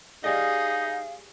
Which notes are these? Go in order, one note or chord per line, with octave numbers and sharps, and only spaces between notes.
D#4 G4 G#4 D5 D#5 F5